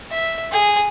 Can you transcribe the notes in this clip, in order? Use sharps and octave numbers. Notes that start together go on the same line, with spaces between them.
E5
G#4